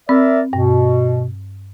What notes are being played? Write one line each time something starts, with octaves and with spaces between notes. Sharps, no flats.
C4 A#4 D5 E5
G2 B2